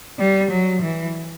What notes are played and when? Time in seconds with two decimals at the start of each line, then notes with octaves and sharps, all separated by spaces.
0.19 G3
0.51 F#3
0.82 E3